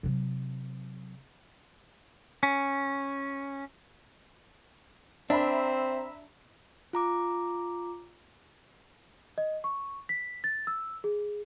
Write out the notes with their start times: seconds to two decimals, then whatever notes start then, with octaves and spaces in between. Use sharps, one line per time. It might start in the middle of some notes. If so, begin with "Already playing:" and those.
0.03 C3 F#3
2.43 C#4
5.30 C4 D4 E5 A#5 B5
6.93 F4 A#5 D6
9.38 D#5
9.64 C#6
10.09 B6
10.44 A6
10.67 E6
11.04 G#4